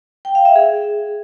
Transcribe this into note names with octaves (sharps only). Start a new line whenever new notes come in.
G5
F5
E5
G#4